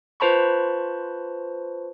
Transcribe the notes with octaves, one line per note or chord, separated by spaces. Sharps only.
F4 B4 C5 A5 B5 C#6